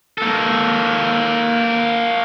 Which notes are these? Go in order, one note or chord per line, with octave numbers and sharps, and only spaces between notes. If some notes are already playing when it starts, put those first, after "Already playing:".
A#3 A4